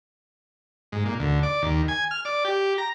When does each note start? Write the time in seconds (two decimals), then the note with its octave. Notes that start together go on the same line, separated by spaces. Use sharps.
0.92 G#2
1.05 A#2
1.20 D2
1.43 D5
1.62 D#2
1.88 G#5
2.11 F6
2.25 D5
2.45 G4
2.78 A#5